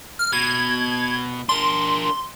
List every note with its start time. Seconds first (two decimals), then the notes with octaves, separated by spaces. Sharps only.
0.19 F6
0.33 B2 G#6
1.49 D4 A#4 C6